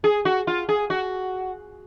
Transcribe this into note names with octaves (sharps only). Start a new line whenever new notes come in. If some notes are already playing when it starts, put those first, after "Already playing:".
G#4
F#4
F4
G#4
F#4